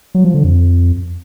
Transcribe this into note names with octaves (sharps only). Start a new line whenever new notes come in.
F#3
F3
D3
F2